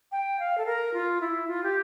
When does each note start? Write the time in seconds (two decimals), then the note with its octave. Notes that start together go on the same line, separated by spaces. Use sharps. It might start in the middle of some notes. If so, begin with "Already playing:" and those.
0.12 G5
0.39 F5
0.58 A4
0.66 A#4
0.94 F4
1.21 E4
1.48 F4
1.63 G4